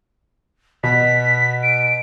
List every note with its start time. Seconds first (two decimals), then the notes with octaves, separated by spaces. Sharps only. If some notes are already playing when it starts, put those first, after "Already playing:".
0.83 B2 B6
1.63 D7